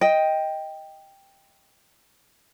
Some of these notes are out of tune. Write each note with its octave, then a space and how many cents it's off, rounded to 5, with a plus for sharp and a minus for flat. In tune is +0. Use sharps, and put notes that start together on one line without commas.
D#5 +10 G5 +5